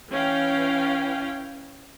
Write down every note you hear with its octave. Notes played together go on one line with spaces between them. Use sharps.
E3 C#4 F5 G5